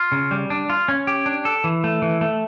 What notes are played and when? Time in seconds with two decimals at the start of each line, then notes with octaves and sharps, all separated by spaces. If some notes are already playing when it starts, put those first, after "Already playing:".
Already playing: F4
0.12 C#3
0.31 G3
0.50 D4
0.70 F4
0.88 C#4
1.07 G4
1.26 D4
1.45 A4
1.64 E3
1.84 A3
2.02 E3
2.21 A3